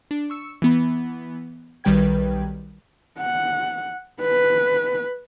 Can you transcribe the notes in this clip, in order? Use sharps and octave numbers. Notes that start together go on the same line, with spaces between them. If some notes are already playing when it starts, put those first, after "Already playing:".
D4
C#6 E6 C#7
E3 B3 B5
B1 D#3 G3 B4 G5 G#6
F#5
B4